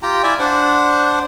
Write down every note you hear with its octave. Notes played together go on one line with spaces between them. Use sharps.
F4 G4 G5 A#5
E4 D5 E5 G#5
D4 C5 F#5